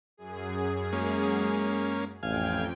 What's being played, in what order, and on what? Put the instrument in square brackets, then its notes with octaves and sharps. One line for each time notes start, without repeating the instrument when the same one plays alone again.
[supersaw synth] F#2 G#4
[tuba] G#3 [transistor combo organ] A#3 C#4
[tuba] A1 [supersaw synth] F2 G5 [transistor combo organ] F5 G#5